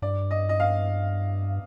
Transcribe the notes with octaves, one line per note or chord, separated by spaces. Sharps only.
G2 D5
D#5
D#5
F5